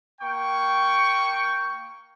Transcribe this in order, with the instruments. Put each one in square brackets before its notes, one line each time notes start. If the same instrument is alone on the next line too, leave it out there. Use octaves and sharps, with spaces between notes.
[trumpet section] A#3 G5 C#6